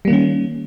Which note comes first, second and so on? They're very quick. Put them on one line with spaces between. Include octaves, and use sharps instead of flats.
G3 A#3 D#3 C#4